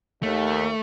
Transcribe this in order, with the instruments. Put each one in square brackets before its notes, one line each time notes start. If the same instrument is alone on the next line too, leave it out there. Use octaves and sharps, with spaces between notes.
[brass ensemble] D#2 [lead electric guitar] A3